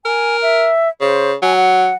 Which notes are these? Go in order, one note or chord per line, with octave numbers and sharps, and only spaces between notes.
A#4 G#5
E5
C#3 C5
F#3 G#5
F#5